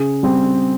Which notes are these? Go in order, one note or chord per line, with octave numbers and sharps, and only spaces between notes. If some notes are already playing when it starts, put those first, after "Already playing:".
Already playing: C#3 G#4
G3 C4